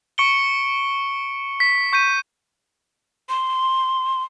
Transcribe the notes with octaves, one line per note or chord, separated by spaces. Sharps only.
C#6 C#7 D7 G7
B6
C#6 G6 B6 D#7
C6